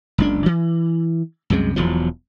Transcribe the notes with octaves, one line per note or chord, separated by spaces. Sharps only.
F#1 C#2 D4
E3
C2 F#2 C3 G#3
E1 E2 F3 F#3